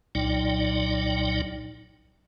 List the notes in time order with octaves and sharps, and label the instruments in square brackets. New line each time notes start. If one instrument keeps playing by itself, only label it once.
[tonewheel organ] C2 A#2 F#3 D#4 D5 G5